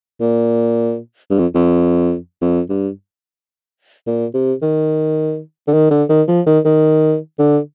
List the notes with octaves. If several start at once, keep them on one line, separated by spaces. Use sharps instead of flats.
A#2
G2
F2
F2
F2
G2
A#2
C3
D#3
D3
D#3
D3
D#3
F3
D#3
D#3
D3